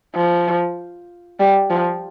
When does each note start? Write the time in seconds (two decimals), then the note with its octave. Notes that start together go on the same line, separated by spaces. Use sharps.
0.16 F3
1.39 G3
1.70 F3